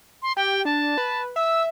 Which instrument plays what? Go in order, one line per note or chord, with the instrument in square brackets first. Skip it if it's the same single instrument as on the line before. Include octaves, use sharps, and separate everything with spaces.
[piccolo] C6
[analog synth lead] G4 [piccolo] G5
[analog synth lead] D4 [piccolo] A5
[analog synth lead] B4
[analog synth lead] E5 [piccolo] E6